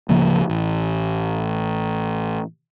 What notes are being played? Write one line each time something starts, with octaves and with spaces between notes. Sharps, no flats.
D1 C#3 F3 A#3
A1